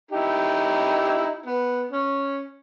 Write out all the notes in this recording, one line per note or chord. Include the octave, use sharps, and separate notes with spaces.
D#4 E4 G4
B3
C#4